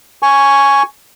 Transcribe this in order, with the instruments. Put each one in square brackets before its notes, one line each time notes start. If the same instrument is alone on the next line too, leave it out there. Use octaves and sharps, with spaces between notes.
[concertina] G#5 C#6